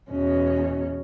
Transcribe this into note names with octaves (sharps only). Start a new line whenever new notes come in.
E2 B2 C#4